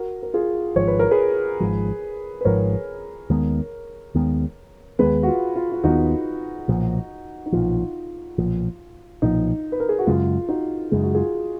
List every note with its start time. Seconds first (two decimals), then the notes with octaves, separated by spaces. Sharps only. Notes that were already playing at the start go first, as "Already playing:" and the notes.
Already playing: F#4 A#4
0.23 A#4
0.34 F4 G#4
0.76 G#1 G#2 F3 C#5
0.87 B4
0.99 A#4
1.11 G#4 B4
1.60 G#1 G#2 F3
2.41 B4
2.45 G#1 G#2 F3 A#4 C#5
3.30 D#2 D#3 G#3 B3
4.15 D#2 D#3 G#3 B3
4.99 D#2 D#3 G#3 B3 G#4 B4
5.23 F#4
5.28 F4
5.56 F4
5.72 F4
5.84 D#2 D#3 G#3 B3 D#4 F#4
6.68 B1 A#2 F3
7.46 D#4
7.52 B1 A#2 F3 F4
8.38 B1 A#2 F3
9.22 B1 A#2 F3 D#4
9.72 B4
9.80 A#4
9.89 G#4
9.99 F#4
10.07 F#2 C#3 G#3 F4
10.49 D#4 F#4
10.91 F#2 C#3 G#3 G#4
11.03 F#4
11.14 F4 G#4